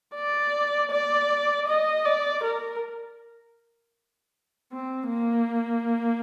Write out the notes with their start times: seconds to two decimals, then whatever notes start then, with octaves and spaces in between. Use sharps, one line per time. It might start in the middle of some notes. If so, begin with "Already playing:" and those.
0.15 D5
0.91 D5
1.68 D#5
2.05 D5
2.44 A#4
4.72 C4
5.09 A#3